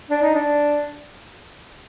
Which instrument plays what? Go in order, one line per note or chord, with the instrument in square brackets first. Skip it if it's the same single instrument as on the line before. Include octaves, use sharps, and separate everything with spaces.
[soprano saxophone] D4
D#4
D4